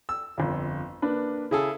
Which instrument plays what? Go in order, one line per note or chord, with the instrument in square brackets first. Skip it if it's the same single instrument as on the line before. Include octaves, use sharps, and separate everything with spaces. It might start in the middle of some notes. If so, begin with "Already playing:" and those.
[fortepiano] E6
[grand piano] G1 F2
A#3 D4 B4
[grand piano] C#3 [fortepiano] E4 G#4 A4